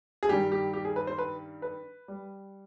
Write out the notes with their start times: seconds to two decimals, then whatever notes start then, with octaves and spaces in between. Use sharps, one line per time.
0.23 G#4
0.29 G2 D#3 G3 G4
0.52 G4
0.73 G4
0.85 G#4
0.96 B4
1.07 C5
1.19 B4
1.62 B4
2.08 G3